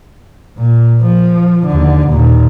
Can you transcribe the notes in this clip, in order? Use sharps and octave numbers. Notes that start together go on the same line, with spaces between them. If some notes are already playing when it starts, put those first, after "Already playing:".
A#2
F3
D#2 D3
D#2 A#2